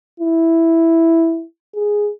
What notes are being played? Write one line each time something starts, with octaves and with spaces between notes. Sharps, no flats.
E4
G#4